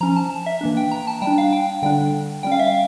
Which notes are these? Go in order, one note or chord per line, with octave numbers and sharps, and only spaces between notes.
F3 C#4 A#5
A5
E5
E3 A#3 D4
G5
A#5
A5
G3 G5
D4
F5
G5
D3 G3 D4 G5
G3 C#4 G5
F5
E5
F5